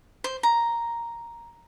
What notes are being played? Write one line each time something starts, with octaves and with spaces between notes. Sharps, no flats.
C5
A#5